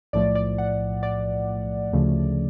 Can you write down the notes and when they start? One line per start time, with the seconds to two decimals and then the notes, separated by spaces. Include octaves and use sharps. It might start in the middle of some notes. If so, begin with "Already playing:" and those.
0.13 B1 A2 F3 A3 D5
0.35 D5
0.58 F#5
1.03 D5
1.93 D2 C#3 F3 A3